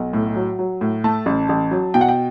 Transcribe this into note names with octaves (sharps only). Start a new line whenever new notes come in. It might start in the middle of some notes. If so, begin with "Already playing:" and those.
Already playing: B1 F#5
A2
F#3
F#3
A2
A3 A5
A1
A1
F#3
B2 G5
F#5
G5